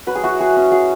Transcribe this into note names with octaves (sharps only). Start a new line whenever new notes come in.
F#3 B4
G#4
E4 F#4
F#3 G#4
C#4
F#3 G#4